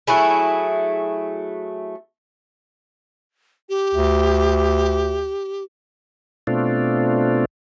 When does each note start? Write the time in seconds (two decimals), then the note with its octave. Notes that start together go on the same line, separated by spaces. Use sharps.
0.07 F#3 A3 E4 G#4
3.69 G4
3.95 D2
6.47 B2 A3 C4 D4 F4